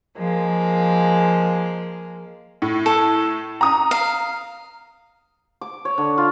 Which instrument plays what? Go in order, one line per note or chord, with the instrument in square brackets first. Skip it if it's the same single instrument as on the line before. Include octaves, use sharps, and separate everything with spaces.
[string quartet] F3 G#3 A#3
[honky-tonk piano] A2
[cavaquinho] A4
[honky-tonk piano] A#5 D#6
[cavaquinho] F5
[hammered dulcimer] D6
C#5
D3
F4